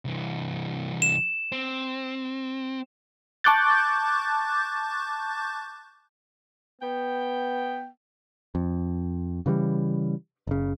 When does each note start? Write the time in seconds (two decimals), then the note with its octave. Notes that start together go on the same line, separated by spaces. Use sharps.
0.05 C2 E3
1.02 E7
1.52 C4
3.44 A5 C#6 D6 F#6 G6 A6
6.82 B3 G5
8.55 F2
9.46 C#3 E3 F#3 G3
10.47 F#1 C#3